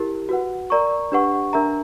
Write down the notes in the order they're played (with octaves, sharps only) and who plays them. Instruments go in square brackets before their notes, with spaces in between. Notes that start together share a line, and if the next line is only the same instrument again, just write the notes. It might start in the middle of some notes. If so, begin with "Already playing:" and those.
Already playing: [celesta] E4 G4 A#4
F#4 B4 F#5
A#4 D5 A#5 C#6
D4 G4 B4 F#5 C#6
D4 A#4 E5 A#5